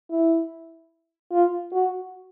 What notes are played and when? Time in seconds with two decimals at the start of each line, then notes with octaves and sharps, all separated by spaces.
0.10 E4
1.32 F4
1.72 F#4